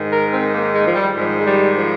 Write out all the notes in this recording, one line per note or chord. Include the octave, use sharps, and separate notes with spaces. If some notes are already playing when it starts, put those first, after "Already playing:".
Already playing: G#2 D#3
A#4
C4
A#3
G#3
F3
G3
G#2 D#3 F3
G#3
G3
F3